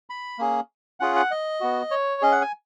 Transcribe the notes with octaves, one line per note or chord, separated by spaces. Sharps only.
B5
A#3 C#4 G#4
C#4 F4 G#4 F#5
F#5
D#5
B3 F#4
C#5
C#4 G#4 D#5
F#5
G#5